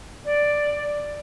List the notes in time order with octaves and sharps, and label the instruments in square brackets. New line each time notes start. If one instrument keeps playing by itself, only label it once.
[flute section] D5